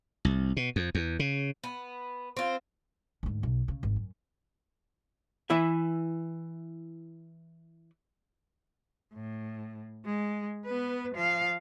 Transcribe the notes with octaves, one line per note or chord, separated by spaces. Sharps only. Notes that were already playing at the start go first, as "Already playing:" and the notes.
C2
B2
F2
E2
C#3
B3
C4 F4
D2 G#2
B1
C#3
G#1
F#2
E3 E4 E5
A2
G#3
B3 B4
F3 F5